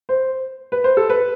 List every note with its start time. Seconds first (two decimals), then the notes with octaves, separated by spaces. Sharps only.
0.09 C5
0.72 B4
0.84 C5
0.97 A4
1.10 B4